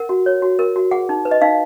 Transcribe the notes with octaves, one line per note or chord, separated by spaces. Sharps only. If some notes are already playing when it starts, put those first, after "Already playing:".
Already playing: A#4 F#5
F#4
C#5
F#4
A#4
F#4
G#4 F#5
D#4
B4
D#5
D#4 F5